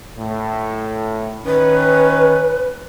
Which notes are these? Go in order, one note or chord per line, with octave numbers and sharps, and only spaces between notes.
A2
D#3 C#4 B4